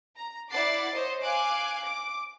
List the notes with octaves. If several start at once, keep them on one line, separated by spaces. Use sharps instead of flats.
A#5
E4 D5 F#5 D6 A6 C7
C5 C#5 D#5
F5 G#5 D6 F#6
D6